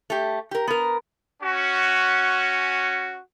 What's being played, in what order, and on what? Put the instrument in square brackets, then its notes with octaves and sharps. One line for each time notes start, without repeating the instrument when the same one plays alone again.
[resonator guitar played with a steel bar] A3 G4
G4 A#4
B3 A#4
[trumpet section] C#4 F#4